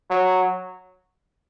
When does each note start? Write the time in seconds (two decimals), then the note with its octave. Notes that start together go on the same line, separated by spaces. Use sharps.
0.10 F#3